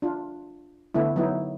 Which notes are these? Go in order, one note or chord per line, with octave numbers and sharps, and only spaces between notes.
D4 F4
D3 A3 B3 E4
F#3 B3 D#4 E4